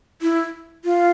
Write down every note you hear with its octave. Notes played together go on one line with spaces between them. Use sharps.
E4
F4